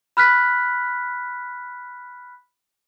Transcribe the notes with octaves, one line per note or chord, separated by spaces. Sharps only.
B5 F6 F#6 B6